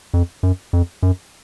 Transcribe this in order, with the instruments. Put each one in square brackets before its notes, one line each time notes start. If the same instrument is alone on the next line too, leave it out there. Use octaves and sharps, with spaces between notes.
[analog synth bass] F2
F#2
F2
F#2